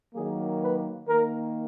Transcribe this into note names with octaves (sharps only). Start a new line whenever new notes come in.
D#3 F#3 A#3 G#4
B4
D#3 A#3 A#4